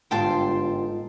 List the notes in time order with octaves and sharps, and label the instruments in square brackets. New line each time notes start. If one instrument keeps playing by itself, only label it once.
[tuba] G1 [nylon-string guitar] G#2 F4 [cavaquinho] G5 A5 C6